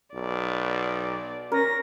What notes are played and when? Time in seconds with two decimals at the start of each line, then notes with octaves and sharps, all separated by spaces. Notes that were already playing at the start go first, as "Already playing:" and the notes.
0.14 B1 D5
1.52 C#4 A#4 A#6